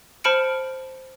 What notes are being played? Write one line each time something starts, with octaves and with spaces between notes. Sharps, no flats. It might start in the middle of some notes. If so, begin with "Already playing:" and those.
C5 A5 B5 F6 C#7 D7